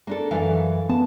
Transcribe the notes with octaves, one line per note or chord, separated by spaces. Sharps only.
A#3 D4 A4
F#2 E3 F5
B3 A5